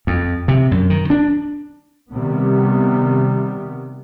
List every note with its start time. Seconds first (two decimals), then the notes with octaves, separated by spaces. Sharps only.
0.07 F2
0.48 C3
0.71 F#2
0.90 D#3
1.10 D4
2.12 C3 D#3 G3 B3